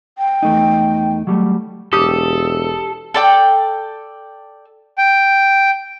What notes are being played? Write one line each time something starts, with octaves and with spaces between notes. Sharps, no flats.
G5
E2 A3 D#4
F#3 G3 A3
E1 G4 A4 D#6
A4 D5 G5
G5